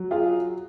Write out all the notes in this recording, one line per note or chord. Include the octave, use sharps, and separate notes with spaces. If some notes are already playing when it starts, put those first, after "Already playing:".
Already playing: F#3
F4 G#4